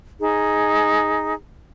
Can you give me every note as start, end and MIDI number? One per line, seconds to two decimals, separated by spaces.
0.19 1.33 63
0.19 1.33 68